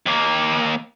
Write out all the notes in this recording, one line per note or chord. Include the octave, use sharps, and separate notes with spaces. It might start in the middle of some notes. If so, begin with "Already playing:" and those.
D#2 A#3